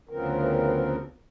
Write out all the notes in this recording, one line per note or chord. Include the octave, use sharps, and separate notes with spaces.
D2 C#3 F3 B3 C4 A#4